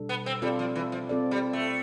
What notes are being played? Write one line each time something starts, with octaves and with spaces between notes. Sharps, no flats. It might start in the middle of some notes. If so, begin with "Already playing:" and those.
Already playing: B2 G3 D4 A4
B3
C4
G3 C4 F4 A4 D5
F3
E3
F3
C4 F4 A4 D5
G3
A3